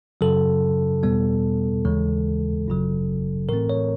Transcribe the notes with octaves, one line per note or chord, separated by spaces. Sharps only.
F#2 C#3 F#3 A4
E2 B2 G3 B3
D#2 C#3 E3 G#3
G1 F#2 C#3 F#3
A2 E3 A3 C4 A#4
C#5